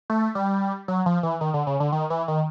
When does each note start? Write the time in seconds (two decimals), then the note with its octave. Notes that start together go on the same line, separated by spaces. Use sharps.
0.10 A3
0.35 G3
0.88 F#3
1.06 F3
1.23 E3
1.41 D#3
1.54 D3
1.67 C#3
1.80 D3
1.92 D#3
2.10 E3
2.28 D#3